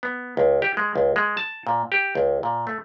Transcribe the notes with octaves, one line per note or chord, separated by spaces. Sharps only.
B3
C#2
G4
G#3
C#2
G#3
A5
A#2
G4
C#2
A#2
A3